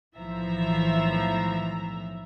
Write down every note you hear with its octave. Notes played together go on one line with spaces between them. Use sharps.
B1 A2 E3 F3 E5 A#5